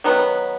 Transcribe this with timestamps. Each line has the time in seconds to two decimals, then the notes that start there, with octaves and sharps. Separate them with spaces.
0.04 D#3 F#3 B3